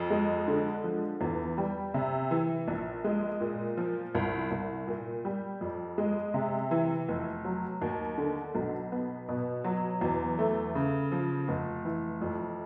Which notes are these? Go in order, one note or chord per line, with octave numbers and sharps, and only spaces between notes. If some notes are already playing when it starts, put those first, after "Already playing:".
Already playing: F2
G#3
D3
F3
E2
G3
C3
E3
A#1
G#3
A#2
F3
C2
C2
A#2
G3
F2
G#3
C3
E3
F1
F#3
D#2
D3
B1
B3
B2
F#3
E2
A3
C#3
F3
F1
E3
F2